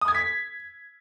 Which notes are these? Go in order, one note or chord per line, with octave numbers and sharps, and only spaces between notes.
D#6
G#6
B6